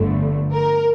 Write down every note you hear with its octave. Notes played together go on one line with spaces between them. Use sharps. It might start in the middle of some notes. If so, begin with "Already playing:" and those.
Already playing: G1 G2 D3 F3 A3
A#4